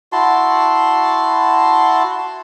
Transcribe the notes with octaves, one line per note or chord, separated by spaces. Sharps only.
E4 F#4 A5 C6